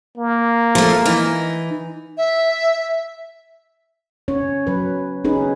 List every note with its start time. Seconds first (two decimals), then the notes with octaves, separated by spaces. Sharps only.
0.18 A#3
0.75 F3 A3
1.05 E3 D#4
2.17 E5
4.28 C#4 C#5
4.67 F#3 B4
5.25 C#4 D#4 G#4 B4